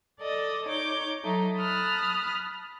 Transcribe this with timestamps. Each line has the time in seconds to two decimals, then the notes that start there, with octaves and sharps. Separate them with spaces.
0.20 A4 D5 D#5
0.66 D#4 C#5 D6 G6
1.23 F#3 A3 D#4
1.55 A5 B5 D#6 F6 F#6